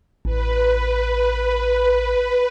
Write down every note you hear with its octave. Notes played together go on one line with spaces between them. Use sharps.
A1 B4